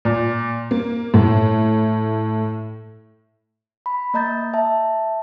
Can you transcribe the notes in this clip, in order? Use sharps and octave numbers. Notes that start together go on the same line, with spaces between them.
A#2
A#3
A2
B5
A#3 D#5 A#5 G6 A6
E5 A5